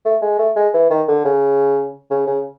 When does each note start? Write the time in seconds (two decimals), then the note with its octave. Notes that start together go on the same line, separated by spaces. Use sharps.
0.05 A3
0.22 G#3
0.39 A3
0.56 G#3
0.74 E3
0.90 D#3
1.08 D3
1.25 C#3
2.10 C#3
2.27 C#3